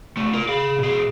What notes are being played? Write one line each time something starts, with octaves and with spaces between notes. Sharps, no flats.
C#2 A3
F4 A#4
G#4 F5
B2 G#4